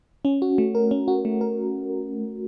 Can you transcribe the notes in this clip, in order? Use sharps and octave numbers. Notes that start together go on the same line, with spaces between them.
C#4
F#4
A3
A#4
C#4
F#4
A3
A#4